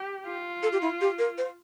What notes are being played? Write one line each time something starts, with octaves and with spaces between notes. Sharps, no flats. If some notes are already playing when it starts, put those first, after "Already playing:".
Already playing: G4
F4
A4
G4
E4
G4
A#4
C5